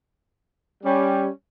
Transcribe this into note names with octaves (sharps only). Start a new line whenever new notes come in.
G3 C#4 G4